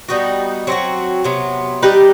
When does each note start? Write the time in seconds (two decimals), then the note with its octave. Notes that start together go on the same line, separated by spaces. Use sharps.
0.09 G3 B3 D#4 F#4
0.67 F#3 C4 D#4 F#4
1.24 C3 F#3 B3
1.83 G3 D#4 G4 B4